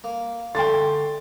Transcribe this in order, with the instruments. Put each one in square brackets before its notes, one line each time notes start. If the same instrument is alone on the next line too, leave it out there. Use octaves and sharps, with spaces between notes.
[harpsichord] A#3
[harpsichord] D3 A3 [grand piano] G5 C6 A6